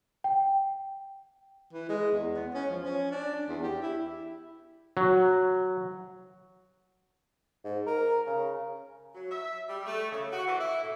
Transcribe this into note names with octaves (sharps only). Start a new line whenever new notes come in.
G5
E3
G#3
E2
B3
C#4
F3
C#4
D4
E2
G4
E4
F#3
G#2
A#4
C#3
F#3
E5
G3
A3
C#3
F#4
E3
E4
A2